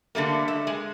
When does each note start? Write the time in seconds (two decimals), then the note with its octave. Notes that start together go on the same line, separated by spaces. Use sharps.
0.15 D3 G3 A3 A#3
0.48 E5
0.67 G#3